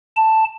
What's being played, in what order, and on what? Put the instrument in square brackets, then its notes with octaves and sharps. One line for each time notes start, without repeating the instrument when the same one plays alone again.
[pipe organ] A5